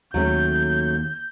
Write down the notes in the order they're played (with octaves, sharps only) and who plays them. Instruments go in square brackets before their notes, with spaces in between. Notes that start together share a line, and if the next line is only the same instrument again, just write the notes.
[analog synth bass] D#2 [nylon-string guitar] F#3 A3 C#4 [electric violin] G6